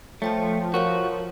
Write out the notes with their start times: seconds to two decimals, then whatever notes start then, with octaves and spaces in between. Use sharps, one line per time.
0.22 F3 A3 C#5 G5 A5
0.74 F#4 A#4 C#5 F5